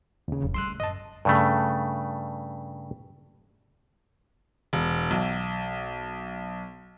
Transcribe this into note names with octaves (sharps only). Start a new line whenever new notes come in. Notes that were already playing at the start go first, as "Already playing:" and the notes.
D#2 C#3
F1 B1
G3 A3 C6 E6 F#6
F#2 D#5 A5
G2 C#3 A3
E1
B1